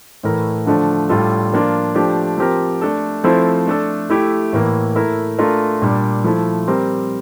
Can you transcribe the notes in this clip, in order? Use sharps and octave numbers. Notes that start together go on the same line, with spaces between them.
A2 E3 A3 E4 A#4
D3 F3 A3 D4
A2 G3 D4 F4 A4
F3 A#3 D4 F4
F3 A3 D4 G4
F3 C4 G4 A#4
A3 D4 A4
F3 A3 C4 E4 A4
A3 D4 A4
A3 E4 G4
A2 E3 A#3
A3 E4 A#4
A3 D4 F4 A#4
A#2 G3 D4
F3 A3 E4
G3 C4 G4 A#4